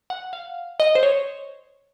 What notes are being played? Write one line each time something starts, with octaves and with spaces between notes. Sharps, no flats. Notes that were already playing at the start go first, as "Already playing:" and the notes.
F#5
F5
D#5
C5
C#5